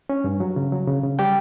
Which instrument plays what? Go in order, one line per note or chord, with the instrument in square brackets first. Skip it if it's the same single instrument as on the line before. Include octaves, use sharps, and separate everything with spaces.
[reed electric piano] C#4
G2
F#3
C#3
F#3
C#3
C#3
G3 G4 G5